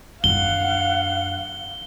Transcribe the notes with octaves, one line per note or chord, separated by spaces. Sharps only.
F#2 D3 F5 F#5 G7